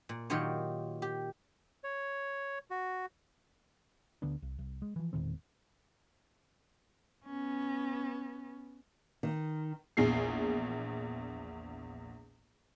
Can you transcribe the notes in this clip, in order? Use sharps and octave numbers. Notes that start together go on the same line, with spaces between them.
A#2
A#2 D#3 F#3 F4 G4 C#5
G4
C#5
F#4
D2 D3 B3 D4
C2
C2
G#3
E3 F3
E1 A#2 D#3 C4
B3 C#4
D#3
A#1 E2 G#4 C7